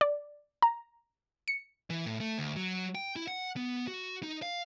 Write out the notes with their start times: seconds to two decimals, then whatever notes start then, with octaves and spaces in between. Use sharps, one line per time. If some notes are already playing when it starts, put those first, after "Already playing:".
0.01 D5
0.62 A#5
1.48 C#7
1.90 E3
2.06 A2
2.20 A3
2.38 D2
2.56 F#3
2.95 G5
3.16 E4
3.28 F#5
3.57 B3
3.87 F#4
4.23 D#4
4.42 F5